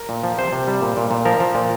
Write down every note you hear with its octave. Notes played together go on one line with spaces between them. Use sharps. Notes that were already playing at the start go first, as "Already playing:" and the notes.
Already playing: A#4
A#2
F3
C3 C5
C3
G3
A#2
A#2
A#2
F3 A#4
F3
A#2